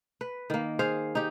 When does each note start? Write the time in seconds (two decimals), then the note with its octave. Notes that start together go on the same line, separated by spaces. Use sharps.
0.21 B4
0.50 D#3 A#3
0.79 G#4 C5 F5
1.15 D#4 G4